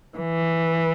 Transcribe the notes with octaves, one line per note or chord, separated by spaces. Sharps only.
E3